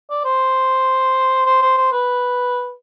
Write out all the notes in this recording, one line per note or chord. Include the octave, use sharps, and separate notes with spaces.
D5
C5
C5
C5
C5
B4